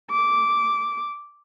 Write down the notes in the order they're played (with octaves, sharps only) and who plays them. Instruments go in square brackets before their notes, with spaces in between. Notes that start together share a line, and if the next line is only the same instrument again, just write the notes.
[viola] D6